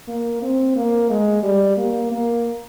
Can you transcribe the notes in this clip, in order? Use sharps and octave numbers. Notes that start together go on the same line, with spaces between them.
A#3
C4
A#3
G#3
G3
A#3
A#3